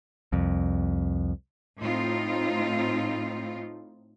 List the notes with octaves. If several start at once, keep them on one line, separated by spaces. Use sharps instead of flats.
C2 F2
A2 C4 D#4 F4